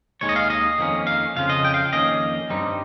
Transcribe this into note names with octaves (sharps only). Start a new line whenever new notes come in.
D#2 D#3 G#3 C#5
D#5
F5
D#5
F2 D#3 A#3 C#4
F5
F2 C#3 F3 F5
D#5
G5
F5
F2 D#3 A#3 C#4 D#5
G2 G3 C4 D#4